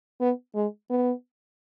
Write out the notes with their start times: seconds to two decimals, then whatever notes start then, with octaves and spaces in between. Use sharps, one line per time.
0.21 B3
0.55 G#3
0.90 B3